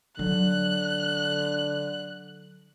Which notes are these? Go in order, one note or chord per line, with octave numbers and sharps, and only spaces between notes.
D3 F#3 F#6